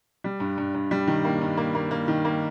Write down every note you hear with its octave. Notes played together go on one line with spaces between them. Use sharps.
G3
G2
G2
G2
G3
D#3
A#3
G2
A#3
A#3
A#3
D#3
A#3